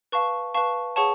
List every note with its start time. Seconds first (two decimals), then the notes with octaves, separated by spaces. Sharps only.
0.12 B4 F5 A5 C#6
0.54 B4 F5 A5 C#6
0.96 G#4 C#5 F#5 A5 C#6